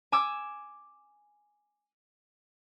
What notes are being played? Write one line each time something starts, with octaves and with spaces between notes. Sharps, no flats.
G#5 D6 E6